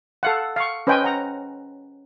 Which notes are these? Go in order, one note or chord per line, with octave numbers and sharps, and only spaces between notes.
A4 F5 F#5
F5 C#6
C#4 B4 C5 D#5 G5 G#5
F#5 A#5